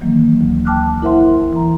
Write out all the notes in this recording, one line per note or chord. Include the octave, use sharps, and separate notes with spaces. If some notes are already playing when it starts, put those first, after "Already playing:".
D#3 E3 F#3 A#3
D2
G5 A5 D6 F6 F#6
E4 A#4 C5 E5 F#5 C6
E3 A#5